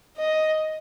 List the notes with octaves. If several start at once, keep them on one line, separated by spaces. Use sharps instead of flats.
D#5